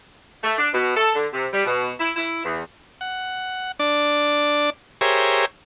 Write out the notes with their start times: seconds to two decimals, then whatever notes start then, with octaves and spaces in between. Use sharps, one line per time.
0.43 A3
0.58 D4
0.73 B2
0.96 A4
1.14 D3
1.33 C3
1.53 G3
1.65 B2
2.00 E4
2.16 E4
2.44 E2
3.01 F#5
3.79 D4 D5
5.01 G4 G#4 A#4 C5 C#5 E5